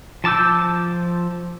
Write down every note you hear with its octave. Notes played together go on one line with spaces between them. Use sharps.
F3 A5 D6 E6 G6